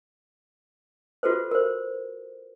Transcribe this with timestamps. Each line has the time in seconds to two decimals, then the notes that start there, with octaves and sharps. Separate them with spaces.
1.23 F4 F#4 A4 B4 C5
1.51 A#4 C5